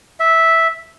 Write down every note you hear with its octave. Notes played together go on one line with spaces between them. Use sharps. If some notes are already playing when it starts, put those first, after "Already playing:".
E5